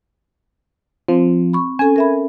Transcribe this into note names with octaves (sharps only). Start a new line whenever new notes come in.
F3 C4
B5 C#6
C#4 A4 G#5
A#4 E5 B5